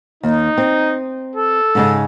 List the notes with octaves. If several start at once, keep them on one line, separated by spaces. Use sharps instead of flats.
D#2 D#4
C4
A4
G#2 C#3 G#3